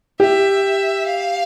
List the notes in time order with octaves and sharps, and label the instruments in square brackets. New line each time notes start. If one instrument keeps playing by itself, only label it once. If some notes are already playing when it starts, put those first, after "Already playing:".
[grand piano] G4 [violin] E5
[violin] F5